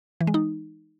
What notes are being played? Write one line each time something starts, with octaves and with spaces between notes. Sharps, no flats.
E3
G#3
D#4